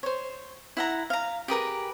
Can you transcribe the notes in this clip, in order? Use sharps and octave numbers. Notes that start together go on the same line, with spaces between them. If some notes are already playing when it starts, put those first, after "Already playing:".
C5 C#5
E4 F#5 A#5
F5 A#5
G4 G#4 A#4 B4